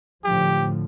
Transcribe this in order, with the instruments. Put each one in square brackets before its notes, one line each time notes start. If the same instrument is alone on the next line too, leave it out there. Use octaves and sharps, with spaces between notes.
[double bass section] A2 D3 F3 [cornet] G4